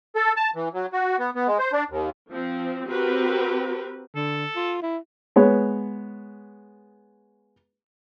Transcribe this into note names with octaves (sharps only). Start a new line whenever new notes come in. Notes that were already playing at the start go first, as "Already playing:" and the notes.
A4
A5
E3
F#3
F#4
B3
B3
G#3
C5
D4
D#2
F3 C4
C4 F#4 G4 A#4 B4
D3 A4
F4
E4
G#3 B3 C#5